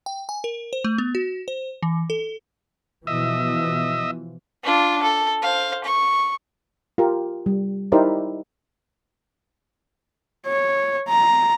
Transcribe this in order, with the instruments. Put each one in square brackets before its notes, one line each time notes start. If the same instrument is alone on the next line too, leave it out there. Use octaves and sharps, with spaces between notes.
[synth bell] G5
G#5
A#4
C5
A3
B3
F#4
C5
E3
A4
[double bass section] B2 E3 F3 [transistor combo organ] D#5 E5
[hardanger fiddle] D4 F4
A4
C5 F5
C#6
[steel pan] F4 G4 A#4
G3
D#4 E4 G4 A#4 C5 D5
[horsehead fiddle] C#5
A#5